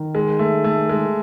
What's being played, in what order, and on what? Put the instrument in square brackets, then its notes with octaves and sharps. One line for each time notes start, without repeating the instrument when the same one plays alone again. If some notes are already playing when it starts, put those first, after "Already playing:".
Already playing: [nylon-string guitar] D#3
[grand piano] G#3
A3
A3
G#3